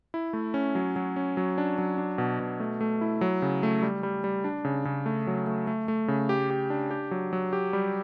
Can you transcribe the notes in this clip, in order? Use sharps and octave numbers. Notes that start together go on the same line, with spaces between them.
E4
A3
C#4
F#3
F#3
C#4
F#3
D4
F#3
D4
B2
B2
A3
A3
E4
F#3
C#3
A3
G3
G3
G3
D4
C#3
C#3
A3
F#3
A3
A3
A3
C#3
G4
G4
D4
G4
F#3
F#3
G4
G3